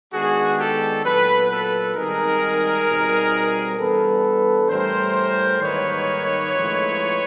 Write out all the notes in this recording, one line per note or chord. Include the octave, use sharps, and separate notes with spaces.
D#3 G#3 B3 D4 F#4 G#4
G4 A4
A#2 F#3 B3 A4 B4
A4 B4
G#2 D#3 G3 C4 D#4 G#4 A#4
B2 G3 C4 D#4
E3 G3 B3 D4 A4 B4
A2 E3 G3 A#4 C5
G#2 D#3 G3 A#3 D#4 B4 C#5
A2 F3 G#3 C4 D#4